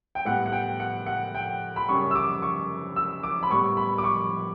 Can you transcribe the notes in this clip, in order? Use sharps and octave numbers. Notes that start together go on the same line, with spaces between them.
G5
A2 G3 B3 F#5
F#5
G5
F#5
F#5
G5
B5
F#2 C#3 G3 C#6
E6
D6
C#6
E6
D6
B5
A2 G3 B3 C#6
B5
D6
C#6